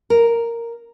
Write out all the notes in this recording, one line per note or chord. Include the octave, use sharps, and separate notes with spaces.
A#4